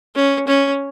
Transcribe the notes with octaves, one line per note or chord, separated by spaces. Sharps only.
C#4
C#4